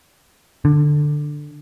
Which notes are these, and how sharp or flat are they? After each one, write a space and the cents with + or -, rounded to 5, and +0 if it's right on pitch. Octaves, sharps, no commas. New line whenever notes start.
D3 +10